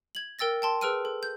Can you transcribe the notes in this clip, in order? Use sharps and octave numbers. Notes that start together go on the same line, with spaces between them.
G#6 F#7
A#4 G5 E6 A6 A#6
G5 A5 C6
G#4 B4 E6 F6 D7 D#7
A4
G6